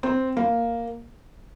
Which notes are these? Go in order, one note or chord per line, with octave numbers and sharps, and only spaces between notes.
C4
A#3